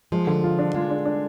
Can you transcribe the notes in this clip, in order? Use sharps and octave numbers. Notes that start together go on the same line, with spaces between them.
F3 G#3
D3
F4
D4
G#3 F4
D4
D4